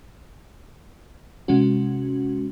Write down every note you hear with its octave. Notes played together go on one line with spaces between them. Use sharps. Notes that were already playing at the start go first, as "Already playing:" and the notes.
C3 G#3 C#4 F#4